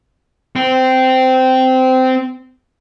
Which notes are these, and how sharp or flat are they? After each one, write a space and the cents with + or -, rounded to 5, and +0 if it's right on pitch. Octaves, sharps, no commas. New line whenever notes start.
C4 -15